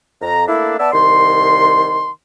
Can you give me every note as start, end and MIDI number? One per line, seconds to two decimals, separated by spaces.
0.21 0.46 41
0.21 0.46 82
0.48 0.76 57
0.48 0.76 58
0.48 0.76 62
0.48 0.76 64
0.79 0.90 59
0.79 0.90 74
0.79 0.90 76
0.79 0.90 81
0.93 2.09 36
0.93 2.09 51
0.93 2.09 84